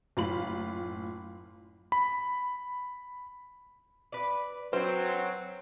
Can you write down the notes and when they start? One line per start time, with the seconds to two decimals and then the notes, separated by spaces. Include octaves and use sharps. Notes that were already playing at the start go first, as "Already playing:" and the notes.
0.17 F#1 A2 F4 B5 F#7
1.92 B5
4.12 B4 D5
4.73 F#3 C4 B4 C5